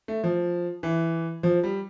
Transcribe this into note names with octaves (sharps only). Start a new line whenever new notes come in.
A3
F3
E3
F3
G3